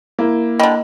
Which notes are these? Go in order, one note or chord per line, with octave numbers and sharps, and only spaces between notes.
A#3 E4
D3 G3 D#5